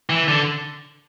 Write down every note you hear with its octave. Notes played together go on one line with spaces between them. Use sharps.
E3
D3